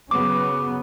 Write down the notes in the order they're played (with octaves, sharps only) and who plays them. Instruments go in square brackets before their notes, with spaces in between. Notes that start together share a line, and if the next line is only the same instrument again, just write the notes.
[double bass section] C#3 F#3 B3 [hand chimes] D6